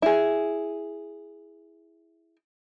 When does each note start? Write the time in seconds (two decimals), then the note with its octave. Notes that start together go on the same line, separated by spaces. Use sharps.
0.02 E4 G#4